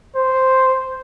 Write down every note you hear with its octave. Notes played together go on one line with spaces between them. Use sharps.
C5